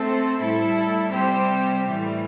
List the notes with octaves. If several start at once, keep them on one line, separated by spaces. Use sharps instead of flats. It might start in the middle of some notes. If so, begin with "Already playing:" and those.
Already playing: A3 C4 A4 C5
A2 G3 E4 A4
C3 G3 C4 G4 C5
A2 E3 G3